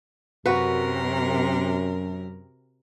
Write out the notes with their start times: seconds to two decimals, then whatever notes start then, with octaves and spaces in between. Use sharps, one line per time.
0.46 F#2 C3 F#4 A#4 B4